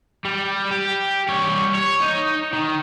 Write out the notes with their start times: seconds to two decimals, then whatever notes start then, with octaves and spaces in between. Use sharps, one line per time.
0.25 G3
0.71 G4
1.28 G3 C#5
1.75 C#5
2.02 D#4
2.53 D#3